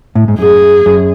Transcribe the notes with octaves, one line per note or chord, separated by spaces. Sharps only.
A2
G#2
F#2 G#4
F#2